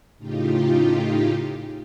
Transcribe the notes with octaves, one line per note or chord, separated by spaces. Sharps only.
A2 C#3 D#4 F4 G4